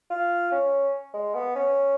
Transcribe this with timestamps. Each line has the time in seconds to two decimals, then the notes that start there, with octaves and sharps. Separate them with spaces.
0.10 F4
0.52 C#4
1.14 G#3
1.35 B3
1.55 C#4